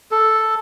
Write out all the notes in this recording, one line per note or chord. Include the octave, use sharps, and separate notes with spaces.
A4